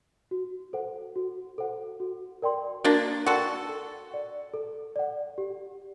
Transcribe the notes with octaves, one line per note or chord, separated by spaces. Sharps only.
F#4
A4 C5 F#5
F#4
A4 C5 F#5
F#4
A#4 D5 G5 C6
A#3 D4 F#4
F#4 A4 A#4 D5 G5 C6
A4
D5 F#5
A4
D5 F#5
G4